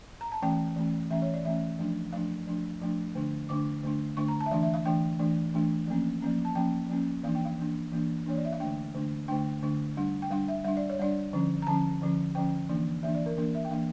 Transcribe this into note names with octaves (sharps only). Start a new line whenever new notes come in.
A#5
A5
E3 A3 C#4 G5
E3 A3 C#4
E3 A3 C#4 E5
C#5
D5
E3 A3 C#4 E5
F3 A3 D4
F3 A3 D4 F5
F3 A3 D4
F3 A3 D4
D3 A3 D4
D3 A3 D4 D6
D3 A3 D4
D3 A3 D4 C#6
A#5
A5
E5
E3 A3 D4 F5
E5
F5
E3 A3 D4 G5
E3 A3 D4
E3 A3 D4
F3 A#3 C#4
F3 A#3 C#4
A5
F3 A#3 C#4 G5
F3 A#3 C#4
E3 A#3 D4 F5
G5
F5
E3 A#3 D4
E3 A#3 D4
E3 A#3 D4 C#5
D5
E5
F5
D3 A3 D4 G5
D3 A3 D4
D3 A3 D4 G5
D3 A3 D4
G3 D4
G5
G3 D4 F5
E5
G3 D4 E5
D5
C#5
G3 D4 D5
D3 F3 C#4
A#5
D3 F3 C#4 A5
D3 F3 C#4
D3 F3 C#4 G5
E3 A#3 D4
E3 A#3 D4 E5
D5
A#4
E3 A#3 D4 A#4
E5
G5
E3 A#3 D4 F5